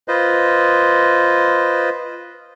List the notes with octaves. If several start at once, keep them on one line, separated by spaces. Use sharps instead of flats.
F4 B4 C5 D#5